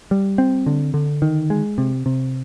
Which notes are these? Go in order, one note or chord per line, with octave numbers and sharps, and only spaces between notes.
G3
C4
D3
D3
D#3
G#3
C3
C3